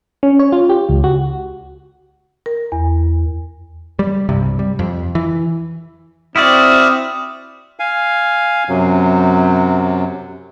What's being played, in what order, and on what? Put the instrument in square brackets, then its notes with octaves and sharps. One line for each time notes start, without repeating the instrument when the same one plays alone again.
[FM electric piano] C#4
C#5
F4
G4
C#2
F#4
[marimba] A#4
E2
[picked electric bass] G3
C2 G2 C3 G3
G3
F2
E3
[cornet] C4 [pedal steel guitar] E4 F#4 D5 [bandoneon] E5 D#6 F6
[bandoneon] F5 G#5
F#2 C3 F#3